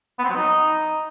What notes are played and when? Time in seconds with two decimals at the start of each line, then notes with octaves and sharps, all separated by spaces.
0.19 B3
0.24 C4
0.29 F#3
0.35 D#4